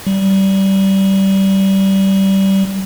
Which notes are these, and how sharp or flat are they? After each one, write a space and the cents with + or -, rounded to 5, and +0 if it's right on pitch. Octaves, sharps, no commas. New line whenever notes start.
G3 -20